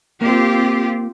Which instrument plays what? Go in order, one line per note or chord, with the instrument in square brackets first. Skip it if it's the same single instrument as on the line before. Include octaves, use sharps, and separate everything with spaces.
[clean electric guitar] A#3 [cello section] C4 F4 G4